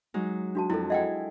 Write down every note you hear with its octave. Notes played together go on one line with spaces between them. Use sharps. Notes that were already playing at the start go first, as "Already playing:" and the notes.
F#3 G#3 D#4
D4 F#4 A5
F2 E4 A4
E4 G#4 D#5 F#5 G5